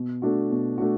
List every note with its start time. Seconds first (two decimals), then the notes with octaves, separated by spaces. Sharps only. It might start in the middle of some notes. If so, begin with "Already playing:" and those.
Already playing: B2
0.22 A3 D4 F#4
0.50 B2
0.78 A3 D4 F#4